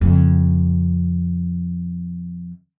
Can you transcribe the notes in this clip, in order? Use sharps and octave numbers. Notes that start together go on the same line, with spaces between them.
F2 C#3